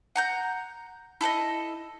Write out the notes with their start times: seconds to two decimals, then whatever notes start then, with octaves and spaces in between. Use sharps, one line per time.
0.16 F#5 A#5 G6
1.21 E4 A4 D5 D#5